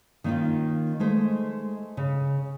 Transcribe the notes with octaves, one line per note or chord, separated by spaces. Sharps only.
D#3 A#3 C#4 D#4 F4
G#3 A3 C5
C#3